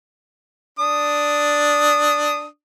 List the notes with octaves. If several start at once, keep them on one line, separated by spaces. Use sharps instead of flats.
D4 D#6